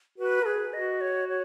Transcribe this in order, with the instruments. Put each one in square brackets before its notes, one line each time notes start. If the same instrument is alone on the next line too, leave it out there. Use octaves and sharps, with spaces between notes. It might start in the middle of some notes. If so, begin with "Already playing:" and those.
[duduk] F#4 [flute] B4
[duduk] A#4
[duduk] G#4 [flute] B4
[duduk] F#4 [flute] D#5
[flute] C#5
C#5